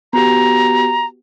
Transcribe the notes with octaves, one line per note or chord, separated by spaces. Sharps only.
B3 F#4 G4 A#5